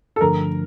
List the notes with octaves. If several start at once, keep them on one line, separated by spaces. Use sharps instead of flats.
A4
G2 D3 F3 A3 D4 A#4